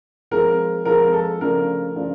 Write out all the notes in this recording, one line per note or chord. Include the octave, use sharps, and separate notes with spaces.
F3 G#3 C4 A#4
F3 G#3 C4 A#4
A4
C#3 F3 A3 D4 A#4
C#3 F3 A3 D4